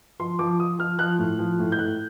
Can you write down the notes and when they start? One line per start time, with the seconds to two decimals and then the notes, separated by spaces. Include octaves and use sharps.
0.20 F3 C6
0.39 F3 D6
0.59 F3 D#6
0.79 F3 F6
0.98 F3 F#6
1.18 A2
1.39 F3
1.59 A2
1.72 G6
1.78 A2 F#6